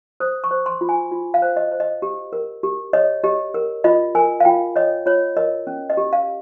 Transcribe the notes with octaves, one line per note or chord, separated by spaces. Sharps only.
C5 D#6
C#6
C5
C6
F4
G#5
F4
F5
C5
D#5
C5
D#5
G4
A#4
G4
C#5 D#5
G4 D#5
A#4
F4 D#5
A#4 G#5
F5
F4 G5
C#5 D#5
F4 C#5
A#4 D#5
C#4
D#5
G4
F5